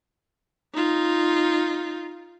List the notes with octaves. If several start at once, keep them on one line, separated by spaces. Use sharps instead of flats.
D#4 F4